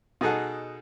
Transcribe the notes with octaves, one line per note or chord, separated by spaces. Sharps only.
B2 D#4 G#4 A4 F#5